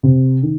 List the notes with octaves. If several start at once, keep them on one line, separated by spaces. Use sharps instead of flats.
C3
D#3